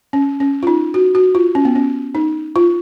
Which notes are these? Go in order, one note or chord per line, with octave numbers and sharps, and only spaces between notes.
C#4
C#4
F4
D#4
F#4
F#4
F4
C#4
B3
C#4
D#4
F4